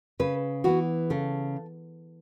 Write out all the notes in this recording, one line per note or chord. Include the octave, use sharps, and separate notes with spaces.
C#3 B4
E3 B3 F#4
C#3 A4